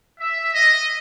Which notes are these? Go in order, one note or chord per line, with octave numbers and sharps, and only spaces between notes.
E5
D#5